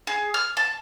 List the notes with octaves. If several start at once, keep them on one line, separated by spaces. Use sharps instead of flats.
G#4
F6
A5